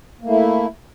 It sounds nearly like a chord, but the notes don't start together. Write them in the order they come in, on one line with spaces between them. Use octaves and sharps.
A#3 A3 E4